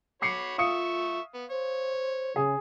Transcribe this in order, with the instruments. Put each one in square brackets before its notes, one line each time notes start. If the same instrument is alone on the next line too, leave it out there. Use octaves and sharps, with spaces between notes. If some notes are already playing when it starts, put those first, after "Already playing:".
[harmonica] F#4 C#5 B5 [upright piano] D6 C7 C#7
[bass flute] F4 [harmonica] E5 C#6 [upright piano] F5 D#6 C#7
[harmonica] B3
[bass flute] C5 [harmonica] C#5
[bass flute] C#3 [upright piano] G#4